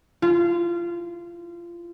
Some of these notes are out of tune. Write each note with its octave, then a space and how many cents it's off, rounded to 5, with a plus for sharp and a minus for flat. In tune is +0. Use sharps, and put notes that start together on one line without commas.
F4 -25